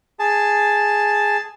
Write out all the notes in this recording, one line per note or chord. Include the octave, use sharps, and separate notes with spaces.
G#4 A5